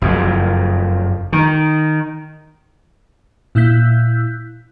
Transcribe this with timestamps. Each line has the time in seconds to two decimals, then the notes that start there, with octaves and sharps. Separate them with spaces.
0.02 F#1 F2
1.33 D#3
3.55 A#2 E4 E6 F#6 G6 B6